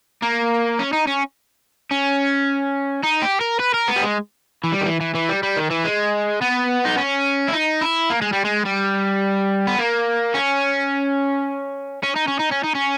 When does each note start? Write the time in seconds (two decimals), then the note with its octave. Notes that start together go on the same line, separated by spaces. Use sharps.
0.23 A#3
0.79 C#4
0.93 D#4
1.07 C#4
1.91 C#4
3.04 D#4
3.22 G4
3.41 A#4
3.60 B4
3.74 A#4
3.88 B3
3.96 G3
4.02 G#3
4.64 E3
4.72 G3
4.81 D#3
4.86 E3
5.00 E3
5.15 E3
5.29 G3
5.43 G3
5.56 D#3
5.70 E3
5.84 G#3
6.42 B3
6.85 D#4
6.97 C#4
7.49 E4
7.54 D#4
7.81 E4
8.10 A#3
8.22 G#3
8.33 G3
8.45 G#3
8.66 G3
9.67 B3
9.79 A#3
10.34 C#4
12.03 C#4
12.16 D#4
12.27 C#4
12.39 D#4
12.51 C#4
12.63 D#4
12.75 C#4